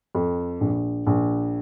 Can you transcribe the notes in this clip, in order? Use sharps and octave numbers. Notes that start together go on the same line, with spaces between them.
F2
A#1
A#1